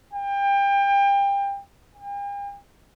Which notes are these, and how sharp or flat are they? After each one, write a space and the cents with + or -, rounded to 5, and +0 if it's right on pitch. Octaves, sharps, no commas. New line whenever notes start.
G5 +30
G5 +45